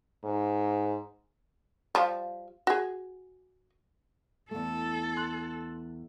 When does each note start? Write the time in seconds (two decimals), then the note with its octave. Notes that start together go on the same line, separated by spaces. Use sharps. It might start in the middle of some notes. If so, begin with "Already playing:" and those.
0.24 G#2
1.95 F3 G3 F5
2.67 F#4 G#4
4.51 E2 A3 A4
5.17 C6 F#6 F#7